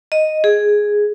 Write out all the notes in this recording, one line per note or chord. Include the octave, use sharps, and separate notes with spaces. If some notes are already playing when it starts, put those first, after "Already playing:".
D#5
G#4